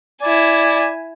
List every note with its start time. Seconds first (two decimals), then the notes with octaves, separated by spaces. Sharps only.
0.22 E4 D5 G#5